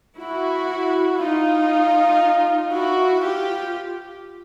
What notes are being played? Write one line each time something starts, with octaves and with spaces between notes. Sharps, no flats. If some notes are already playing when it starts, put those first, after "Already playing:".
E4 F#4
D#4 F4
E4 F#4
F4 G4